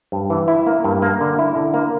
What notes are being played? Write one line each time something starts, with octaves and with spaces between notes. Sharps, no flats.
G2
E3
E4
A#3
G2
A#3
D3
E4
D3
A#3